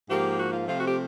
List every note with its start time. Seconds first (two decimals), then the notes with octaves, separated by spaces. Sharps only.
0.09 G#2 F3 A#3 G4
0.38 F#4
0.52 F4
0.67 C3 F3 A3 C4 F4
0.77 F#4
0.86 G4